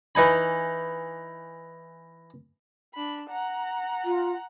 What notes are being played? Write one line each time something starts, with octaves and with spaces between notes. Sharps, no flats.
E3 D#4 G#5 B5
D4 B5
F#5 A#5
F4